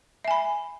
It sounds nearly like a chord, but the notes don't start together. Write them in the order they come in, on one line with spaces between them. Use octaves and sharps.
E5 G#5 B5